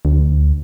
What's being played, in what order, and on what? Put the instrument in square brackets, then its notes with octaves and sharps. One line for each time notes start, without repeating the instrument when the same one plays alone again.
[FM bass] D2